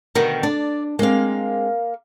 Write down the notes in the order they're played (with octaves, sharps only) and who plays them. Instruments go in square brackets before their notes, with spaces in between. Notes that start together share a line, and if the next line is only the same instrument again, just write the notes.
[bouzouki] B2 D3 D#3 [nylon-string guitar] A#4
[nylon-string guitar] D4 [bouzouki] D5
[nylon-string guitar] G#3 C4 [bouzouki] A#3 F5